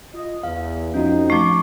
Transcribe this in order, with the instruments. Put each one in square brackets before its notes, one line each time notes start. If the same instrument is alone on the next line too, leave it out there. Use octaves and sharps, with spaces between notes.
[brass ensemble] F4 D#5
[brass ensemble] E2 [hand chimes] F5
[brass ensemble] F2 D#4 [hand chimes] C#4 F#4
[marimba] F3 A3 [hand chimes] C#6 D6